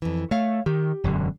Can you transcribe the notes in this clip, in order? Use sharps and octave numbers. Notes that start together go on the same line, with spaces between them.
F2 E3
A3 C#5 F5
D#3 G4
E1 F#2 D3